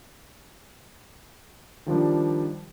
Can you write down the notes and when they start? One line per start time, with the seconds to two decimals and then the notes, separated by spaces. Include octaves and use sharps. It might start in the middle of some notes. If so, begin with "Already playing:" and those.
1.86 D#3 F3 G3 D4